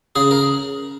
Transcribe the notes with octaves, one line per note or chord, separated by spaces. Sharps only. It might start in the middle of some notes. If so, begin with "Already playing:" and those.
C#3 G#4
A#4